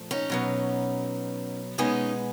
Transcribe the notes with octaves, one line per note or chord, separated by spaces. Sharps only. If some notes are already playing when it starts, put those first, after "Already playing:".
Already playing: A#2 F3 A3
C#4 D#4
B2 F#3 B3
B2 G#3 B3 C#4 D#4